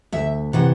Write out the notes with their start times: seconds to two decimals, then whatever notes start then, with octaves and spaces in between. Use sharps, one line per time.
0.12 D2 E5
0.53 C3 E3 F#5